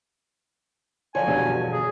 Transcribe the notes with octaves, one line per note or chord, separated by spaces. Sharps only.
D3 F3 F#3 C#5 G#5
E2 G2 B2
G#4